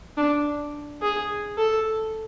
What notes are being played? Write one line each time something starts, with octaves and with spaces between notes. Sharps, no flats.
D4
G#4
A4